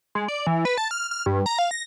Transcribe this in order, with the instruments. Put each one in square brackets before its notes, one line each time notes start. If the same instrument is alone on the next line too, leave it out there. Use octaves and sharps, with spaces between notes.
[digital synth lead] G#3
D5
E3
B4
A5
F6
F6
G2
A#5
F5
A#6